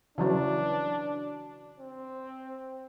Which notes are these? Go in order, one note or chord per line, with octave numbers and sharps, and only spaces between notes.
C#3 E3 F#3 D4
C4